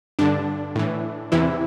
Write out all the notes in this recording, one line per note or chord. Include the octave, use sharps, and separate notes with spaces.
G2 D3 D4
A2 E3
E2 C3 E3 E4